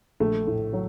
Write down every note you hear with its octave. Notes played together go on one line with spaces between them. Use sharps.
A#1 A3
A2
F#3